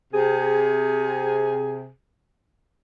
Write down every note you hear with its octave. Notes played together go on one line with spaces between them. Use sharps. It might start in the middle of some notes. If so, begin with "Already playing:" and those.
C3 G#4